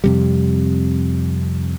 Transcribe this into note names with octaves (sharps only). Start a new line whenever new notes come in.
F2 C3 G3